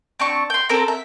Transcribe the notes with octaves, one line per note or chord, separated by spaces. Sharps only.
C4 D4 C#6
G5 C6
C4 A4 A#4
E5